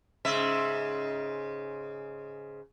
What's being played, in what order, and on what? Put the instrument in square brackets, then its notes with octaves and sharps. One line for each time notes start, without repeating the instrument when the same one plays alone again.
[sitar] G#2 C#3 E5